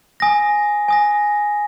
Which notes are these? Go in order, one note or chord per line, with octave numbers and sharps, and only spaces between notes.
G#5 D#6 A#6
G#5 D#6 A#6